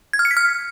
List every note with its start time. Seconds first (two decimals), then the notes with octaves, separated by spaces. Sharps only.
0.13 G#6
0.19 F6
0.25 C#7
0.31 B6
0.37 F6